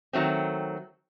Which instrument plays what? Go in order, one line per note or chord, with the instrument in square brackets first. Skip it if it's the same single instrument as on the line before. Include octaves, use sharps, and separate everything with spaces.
[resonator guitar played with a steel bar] D#3 F#3 A3 C4